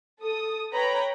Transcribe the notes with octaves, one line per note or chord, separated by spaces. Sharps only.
A4 D#6
B4 C#5 G5 A#5 B5